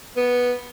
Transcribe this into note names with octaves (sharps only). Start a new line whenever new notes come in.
B3